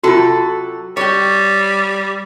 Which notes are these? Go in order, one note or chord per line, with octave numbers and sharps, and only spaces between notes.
C3 F#3 F4 F#4 A4
G3 G4 C#5